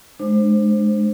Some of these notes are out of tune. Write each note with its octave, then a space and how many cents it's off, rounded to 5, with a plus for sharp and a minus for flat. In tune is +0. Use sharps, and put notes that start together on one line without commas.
G#3 +25 D4 +25 C5 +0